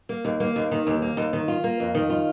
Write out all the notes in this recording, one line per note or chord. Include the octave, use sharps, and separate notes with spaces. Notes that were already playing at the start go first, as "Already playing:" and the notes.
A#3
D#2
A#3
D#2
D#3
D#2
A#3
D#2
D#3
F4
A#3
F2
D#3
F4